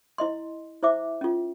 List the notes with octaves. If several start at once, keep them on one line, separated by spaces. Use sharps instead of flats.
E4 D#5 C6
E4 C5 E5 D6
C#4 F4